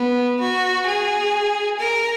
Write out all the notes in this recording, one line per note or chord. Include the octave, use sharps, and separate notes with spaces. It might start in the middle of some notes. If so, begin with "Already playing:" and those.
Already playing: B3
F#4
G#4
A#4